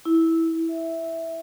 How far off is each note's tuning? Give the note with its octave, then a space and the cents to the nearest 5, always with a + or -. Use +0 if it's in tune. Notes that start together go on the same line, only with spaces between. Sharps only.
E4 -10
E5 -5